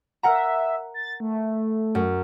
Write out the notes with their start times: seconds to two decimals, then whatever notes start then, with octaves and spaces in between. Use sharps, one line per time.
0.23 A#4 E5 F#5 A#5
0.94 A6
1.20 A3
1.95 F#2